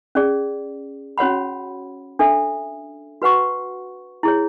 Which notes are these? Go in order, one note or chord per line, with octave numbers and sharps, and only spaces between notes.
C#4 G#4 D5
C#4 F#4 C#5 F#5 B5
D4 A4 E5
F#4 B4 F#5 C#6
E4 G#4 C#5